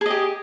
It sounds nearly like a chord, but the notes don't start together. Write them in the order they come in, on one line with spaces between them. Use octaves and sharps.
G#4 D#5 G4